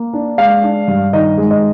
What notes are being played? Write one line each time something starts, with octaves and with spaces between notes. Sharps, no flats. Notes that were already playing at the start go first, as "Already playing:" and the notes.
Already playing: A#3
D4
G#3 F5
D4
G2
D#3 D#5
G#3
D#5